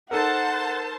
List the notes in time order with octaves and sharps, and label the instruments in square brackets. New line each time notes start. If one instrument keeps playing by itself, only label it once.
[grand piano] D#4 A4 A#4 [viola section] C5 A5 [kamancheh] F#5